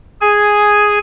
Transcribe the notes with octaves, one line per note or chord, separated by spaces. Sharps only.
G#4 G#5